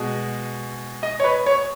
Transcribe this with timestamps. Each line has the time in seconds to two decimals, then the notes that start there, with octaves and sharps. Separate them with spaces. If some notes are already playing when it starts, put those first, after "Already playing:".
Already playing: B2 G#3
1.03 D#5
1.20 C#5
1.24 B4
1.46 C#5